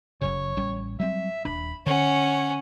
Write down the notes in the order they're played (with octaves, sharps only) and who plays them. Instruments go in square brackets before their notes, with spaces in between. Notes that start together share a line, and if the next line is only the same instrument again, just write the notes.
[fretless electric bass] F#1 F#2 C#3 [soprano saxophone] C#5
[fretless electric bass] A1 G3 C#4
[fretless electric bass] F#3 G3 C4 [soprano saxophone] E5
[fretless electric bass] D#1 D4 [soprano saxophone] B5
[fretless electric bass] D3 [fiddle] C#4 F#5 [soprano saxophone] C#5